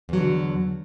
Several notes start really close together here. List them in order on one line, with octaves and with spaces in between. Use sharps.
E2 F#3 D3